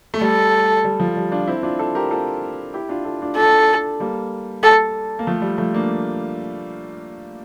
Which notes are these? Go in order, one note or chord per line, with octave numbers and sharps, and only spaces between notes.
A3
G3 A4
G3
F3
G3
D4 F4
C4 E4
D4 F4
F4 A4
G4 A#4
F4 A4
E4 G4
D4 F4
F4 A4
D4 F4
D4 F4 A4
G3 A#3
A4
A#3
F3 A3
G3
F3 A3
A#3 D4